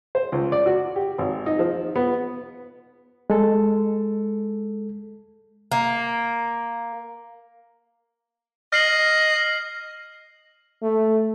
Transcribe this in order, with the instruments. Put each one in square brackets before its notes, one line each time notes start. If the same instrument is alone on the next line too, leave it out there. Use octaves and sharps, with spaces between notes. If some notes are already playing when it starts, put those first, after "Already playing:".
[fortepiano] C5
C#2
D5
F#4
G4
G#1
D#4
F3
B3
[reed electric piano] G#3 A4
[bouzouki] A#3
[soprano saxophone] D#5 [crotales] F6 C7 F#7
[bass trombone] A3